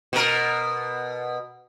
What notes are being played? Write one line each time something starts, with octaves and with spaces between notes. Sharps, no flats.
B2 A#4